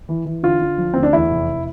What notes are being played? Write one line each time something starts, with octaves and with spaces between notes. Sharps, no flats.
E3
E3
D3 F4
D3
F3
D2 C4
D4
E2 E4
F1